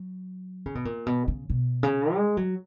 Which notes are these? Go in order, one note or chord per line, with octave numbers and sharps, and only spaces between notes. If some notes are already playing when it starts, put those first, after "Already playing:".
Already playing: F#3
C#3
B2
A#2
B2
C#3
B2
C#3
G#3
F#3